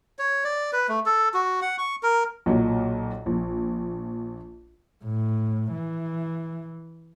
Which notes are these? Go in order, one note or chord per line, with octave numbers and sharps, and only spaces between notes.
C#5
D5
B4
A3
A4
F#4
F#5
C#6
A#4
B1 A#2 F#3
A#1
A2
E3